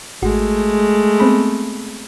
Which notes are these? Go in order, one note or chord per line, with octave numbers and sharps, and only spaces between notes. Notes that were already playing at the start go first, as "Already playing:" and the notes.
G#1 G#3 A3 F#4
B3 C4 B5